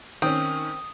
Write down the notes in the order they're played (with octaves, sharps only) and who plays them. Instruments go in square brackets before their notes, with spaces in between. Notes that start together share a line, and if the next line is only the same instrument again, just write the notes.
[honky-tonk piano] D#3 C#4 [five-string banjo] C4 [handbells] D#6